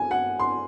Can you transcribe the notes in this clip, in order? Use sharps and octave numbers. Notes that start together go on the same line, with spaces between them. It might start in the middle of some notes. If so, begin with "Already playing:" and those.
Already playing: G#5
F#5
C6